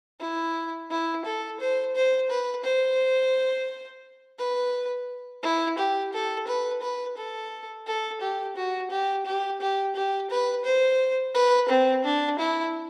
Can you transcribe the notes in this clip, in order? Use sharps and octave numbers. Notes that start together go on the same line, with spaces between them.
E4
E4
A4
C5
C5
B4
C5
B4
E4
G4
A4
B4
B4
A4
A4
G4
F#4
G4
G4
G4
G4
B4
C5
B4
C4
D4
E4